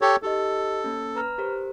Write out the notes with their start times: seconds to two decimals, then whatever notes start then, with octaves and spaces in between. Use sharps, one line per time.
0.01 G4 A4 C#5
0.22 D#4 G4 A4 D#5
0.84 A#3 C#4
1.15 B4 A#5 F6
1.38 G4 A#4 C5